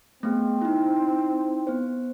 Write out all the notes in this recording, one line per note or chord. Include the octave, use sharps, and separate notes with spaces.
A3 B3 C4 G#4
D#4 E4
B3 C5